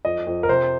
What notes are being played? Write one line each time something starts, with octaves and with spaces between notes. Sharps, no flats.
F2 D#5
F2
A#4
C3 C5